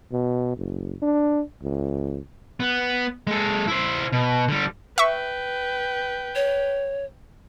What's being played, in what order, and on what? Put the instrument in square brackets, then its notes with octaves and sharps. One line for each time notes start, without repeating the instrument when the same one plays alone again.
[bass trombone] B2
F#1
D4
C#2
[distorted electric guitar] B3
G#3 A4
E4 C5
B2
D3 G3
[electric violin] B4 G5 [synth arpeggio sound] E5 C#6
[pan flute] C#5